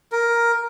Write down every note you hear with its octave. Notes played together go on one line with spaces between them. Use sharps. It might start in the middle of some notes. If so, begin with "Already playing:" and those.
A#4